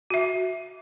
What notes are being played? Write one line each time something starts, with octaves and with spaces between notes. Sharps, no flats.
F#4 E5